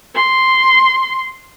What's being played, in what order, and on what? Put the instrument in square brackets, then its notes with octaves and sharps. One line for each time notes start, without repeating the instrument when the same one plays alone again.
[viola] C6